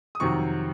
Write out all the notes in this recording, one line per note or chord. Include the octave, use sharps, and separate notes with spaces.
D#6
F2 C3 D#3 F#3 C#6